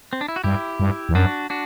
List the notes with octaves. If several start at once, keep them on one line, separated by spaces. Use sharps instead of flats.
C4
D4
E4
F#4
G2 E4 G4
G2
E2
F#2 D4 F#4
D4 F#4